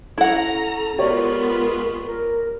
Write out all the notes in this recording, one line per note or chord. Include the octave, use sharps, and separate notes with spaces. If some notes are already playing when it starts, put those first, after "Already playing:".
C#4 E4 A4 F#5 A#5
G#3 B3 F4 G4 A#4 C#5 D5
A#4